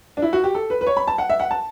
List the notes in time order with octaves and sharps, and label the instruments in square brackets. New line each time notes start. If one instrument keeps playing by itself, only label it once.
[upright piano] D4
E4
F#4
G4
A4
B4
B4
C#5
B5
A5
F#5
E5
F#5
A5